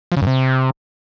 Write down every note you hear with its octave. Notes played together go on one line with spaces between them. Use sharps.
F3
C#3
F#2
C3